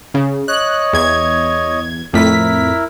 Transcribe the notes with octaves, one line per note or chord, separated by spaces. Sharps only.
C#3
C#5 D#5 F#6
E2 G#6
F2 A2 E4 A#4 B6